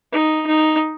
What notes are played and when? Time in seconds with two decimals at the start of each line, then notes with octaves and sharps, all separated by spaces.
0.12 D#4
0.47 D#4